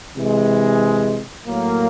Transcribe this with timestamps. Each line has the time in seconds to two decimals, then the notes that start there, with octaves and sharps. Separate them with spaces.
0.17 C3 E3 G#3
1.48 A2 F#3 A#3